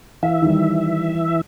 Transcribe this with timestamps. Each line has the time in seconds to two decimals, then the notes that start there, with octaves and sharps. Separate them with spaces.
0.23 E3 E5 F5
0.42 D#3 G3